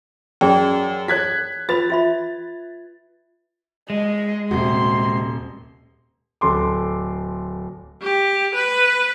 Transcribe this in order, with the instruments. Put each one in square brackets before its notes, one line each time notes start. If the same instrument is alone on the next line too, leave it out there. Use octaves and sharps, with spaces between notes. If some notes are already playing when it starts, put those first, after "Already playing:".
[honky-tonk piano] F#2 [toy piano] G#4 D5 G5
[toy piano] E4 C#5 [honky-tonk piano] F#6 G#6 B6
[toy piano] F4 B4 B5 [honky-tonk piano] A6
[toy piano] F4 E5 B5
[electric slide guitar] G#3 [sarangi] D#5
[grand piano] D#1 [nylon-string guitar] C3 F#4 [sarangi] C6
[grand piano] D1 A4 C6 D6
[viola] G4
B4